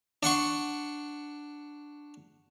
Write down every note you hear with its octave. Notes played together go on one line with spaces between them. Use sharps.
D4 F#5 C6 C#6